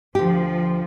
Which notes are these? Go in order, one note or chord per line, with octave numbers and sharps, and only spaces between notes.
D2 F3 G4